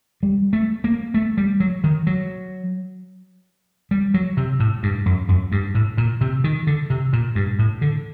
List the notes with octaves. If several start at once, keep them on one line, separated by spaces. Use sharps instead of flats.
G3
A3
A#3
A3
G3
F#3
D#3
F#3
G3
F#3
C3
A2
G2
F#2
F#2
G2
A2
A#2
C3
D#3
D3
C3
A#2
G2
A2
D3